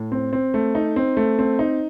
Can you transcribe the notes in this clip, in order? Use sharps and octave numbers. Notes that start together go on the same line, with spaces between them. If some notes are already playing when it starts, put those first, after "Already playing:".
Already playing: A2
C4
C4
A3
D#4
C4
A3
C4
D#4